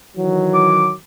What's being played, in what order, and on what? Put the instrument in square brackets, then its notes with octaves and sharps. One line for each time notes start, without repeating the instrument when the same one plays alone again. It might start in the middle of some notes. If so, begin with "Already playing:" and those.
[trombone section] D#3 E3 F#3
[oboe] D6